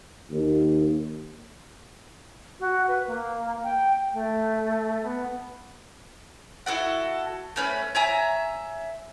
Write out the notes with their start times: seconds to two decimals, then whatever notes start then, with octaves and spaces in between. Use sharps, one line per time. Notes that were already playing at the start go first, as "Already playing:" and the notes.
0.30 D#2
2.60 F#4
2.88 B4
3.07 A#3
3.63 G5
4.13 A3
5.03 B3
6.66 E4 F#4 A4 F#5
7.56 A3 C#4 B4
7.95 C#5 E5 G#5 A#5